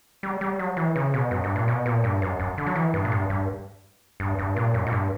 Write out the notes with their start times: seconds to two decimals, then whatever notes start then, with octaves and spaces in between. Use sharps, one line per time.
0.23 G3
0.41 G3
0.59 F#3
0.77 E3
0.96 C#3
1.14 B2
1.31 F#2
1.44 G2
1.56 A#2
1.68 B2
1.86 A#2
2.04 G2
2.22 F#2
2.40 F#2
2.58 D3
2.67 F#3
2.76 E3
2.94 G2
3.05 A#2
3.12 G2
3.30 G2
4.20 G2
4.39 G2
4.56 A#2
4.74 F#2
4.87 A#2
4.92 G2